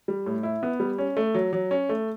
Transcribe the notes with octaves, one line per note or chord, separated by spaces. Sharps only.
G3
A2
E4
B3
G3
C#4
A3
F#3
F#3
C#4
A3